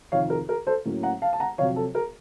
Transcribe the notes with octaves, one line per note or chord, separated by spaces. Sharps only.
F2 C3 D#3 C#5 F5
A#4
A#4
A4 C5
A2 F#3 A#3 C#4
F#5 A#5
F5 A5
A5
F#5 A#5
F2 C3 F#3 C#5 F5
A4
A#4